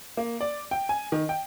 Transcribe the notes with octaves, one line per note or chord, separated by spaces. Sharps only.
A#3
D5
G5
G#5
D#3
G5